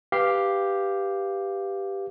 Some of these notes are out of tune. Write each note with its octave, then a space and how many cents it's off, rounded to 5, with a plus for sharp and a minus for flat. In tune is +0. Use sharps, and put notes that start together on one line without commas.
G4 +0 B4 +0 F5 -5